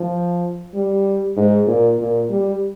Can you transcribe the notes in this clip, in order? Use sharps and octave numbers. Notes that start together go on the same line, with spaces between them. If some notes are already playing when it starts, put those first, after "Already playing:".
Already playing: F3
G3
G#2
A#2
A#2
G3